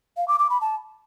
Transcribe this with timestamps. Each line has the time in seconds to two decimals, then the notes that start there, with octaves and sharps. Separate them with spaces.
0.17 F5
0.28 D6
0.39 D6
0.50 B5
0.61 A5